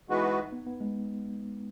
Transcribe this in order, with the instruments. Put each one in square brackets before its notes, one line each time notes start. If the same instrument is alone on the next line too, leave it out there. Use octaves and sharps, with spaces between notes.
[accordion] E3 G#3 B3 F#4 B4 [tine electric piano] D#4
[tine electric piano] D#4
B3
B3
G#3